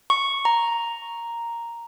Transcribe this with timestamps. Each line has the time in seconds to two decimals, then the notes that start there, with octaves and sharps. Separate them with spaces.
0.10 C#6
0.45 A#5